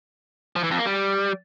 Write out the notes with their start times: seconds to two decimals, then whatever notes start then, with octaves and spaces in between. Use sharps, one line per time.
0.56 F3
0.63 E3
0.71 F2
0.78 A#3
0.86 G3